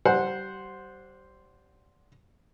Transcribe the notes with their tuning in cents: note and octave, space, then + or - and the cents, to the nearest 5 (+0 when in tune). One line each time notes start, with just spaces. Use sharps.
G3 -30 C5 +0 F#5 -15